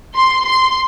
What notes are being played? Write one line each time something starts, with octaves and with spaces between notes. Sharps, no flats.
C6
C6